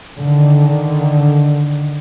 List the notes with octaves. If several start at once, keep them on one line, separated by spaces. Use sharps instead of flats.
D3 D#3